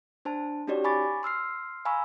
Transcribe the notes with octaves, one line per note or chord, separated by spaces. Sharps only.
D4 C5 A5
C#4 D#4 F#4 G4 C#5 D5
G#5 B5 C#6 D6 A6
C6 E6 F6 C7
F5 G#5 A#5 B5 C#6 E6